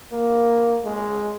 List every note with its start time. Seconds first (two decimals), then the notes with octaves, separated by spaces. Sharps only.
0.12 A#3
0.84 G#3